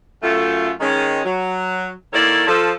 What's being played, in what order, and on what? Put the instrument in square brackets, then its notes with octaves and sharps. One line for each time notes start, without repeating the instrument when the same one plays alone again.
[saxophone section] F#2 A3 F4
D#3 G#3 C#4
F#3
D#3 A#3 E4 A4 C#5 D5
F3 A4